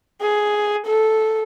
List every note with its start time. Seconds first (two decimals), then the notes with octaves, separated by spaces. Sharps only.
0.21 G#4
0.86 A4